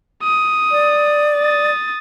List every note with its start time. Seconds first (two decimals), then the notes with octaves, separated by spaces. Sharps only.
0.23 D#6
0.72 D5
1.36 D#6 A6